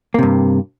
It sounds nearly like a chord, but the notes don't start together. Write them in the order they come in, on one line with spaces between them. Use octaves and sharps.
A#3 C3 G2